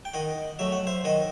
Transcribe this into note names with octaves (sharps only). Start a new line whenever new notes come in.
G5
D#3 D#5 F#5
F#3 A3 E5
F#5
C5 E5
D#3 D#5 F#5